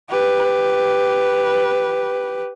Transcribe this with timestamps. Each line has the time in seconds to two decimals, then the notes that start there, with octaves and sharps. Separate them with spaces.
0.10 G4 B4